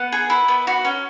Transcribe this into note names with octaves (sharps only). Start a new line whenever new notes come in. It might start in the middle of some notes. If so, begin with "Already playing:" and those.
Already playing: B3 F#5
G#4
E4
B3
F#4
C#4